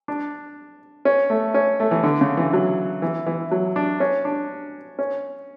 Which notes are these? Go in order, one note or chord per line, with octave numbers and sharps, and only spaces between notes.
D4
C#4
A3
C#4
A3
E3
D3
C#3
E3
F#3
E3
E3
F#3
D4
C#4
D4
C#4